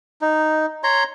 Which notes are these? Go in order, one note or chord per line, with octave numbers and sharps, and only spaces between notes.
D#4
C#5 A#5 C6